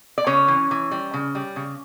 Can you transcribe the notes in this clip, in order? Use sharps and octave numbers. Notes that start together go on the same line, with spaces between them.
D5
C#3 C#4 C#5
E3
E3
G3
C#3
G3
C#3